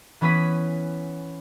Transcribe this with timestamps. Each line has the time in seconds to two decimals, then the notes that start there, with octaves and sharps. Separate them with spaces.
0.21 E3 B3 C#4 B4 D#6 B6